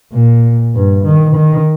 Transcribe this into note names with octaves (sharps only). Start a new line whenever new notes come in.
A#2
G2
D#3
D#3